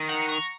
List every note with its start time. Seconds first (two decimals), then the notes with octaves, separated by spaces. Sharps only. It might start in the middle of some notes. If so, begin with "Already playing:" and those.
Already playing: D#3
0.09 F#5 A#5
0.28 A#5 C#6